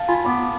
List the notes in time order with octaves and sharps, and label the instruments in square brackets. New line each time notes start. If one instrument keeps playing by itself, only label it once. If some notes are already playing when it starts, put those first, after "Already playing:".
Already playing: [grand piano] F5 A5
[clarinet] F4 [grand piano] G#5 B5
[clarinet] B3 [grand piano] B5 D6